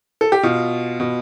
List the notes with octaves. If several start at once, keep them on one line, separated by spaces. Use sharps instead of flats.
A4
G4
B2 F4
B2